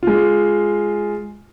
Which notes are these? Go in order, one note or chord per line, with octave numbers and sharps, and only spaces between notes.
G#3 F4